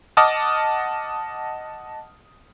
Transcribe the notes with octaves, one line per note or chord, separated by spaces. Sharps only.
D#5 F#5 A5 D6 D#6 F6